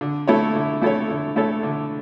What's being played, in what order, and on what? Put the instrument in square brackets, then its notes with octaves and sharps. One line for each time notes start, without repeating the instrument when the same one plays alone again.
[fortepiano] D3
A3 E4 A4 C#5
D3
A3 E4 A4 C#5
D3
A3 E4 A4 C#5
D3